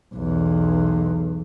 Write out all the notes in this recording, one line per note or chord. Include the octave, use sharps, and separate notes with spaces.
B1 E2